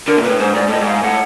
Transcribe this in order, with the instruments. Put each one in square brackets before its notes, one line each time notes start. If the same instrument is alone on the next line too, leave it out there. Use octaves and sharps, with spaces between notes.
[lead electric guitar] D3 [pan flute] A#4
[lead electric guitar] A#2
[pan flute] B4
[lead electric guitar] A2
[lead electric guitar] G#2 [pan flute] C5
[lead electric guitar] G#2 [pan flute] D5
[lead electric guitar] A2 [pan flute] D#5
[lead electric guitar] G#2
[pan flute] F5
[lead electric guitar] A2 [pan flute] F#5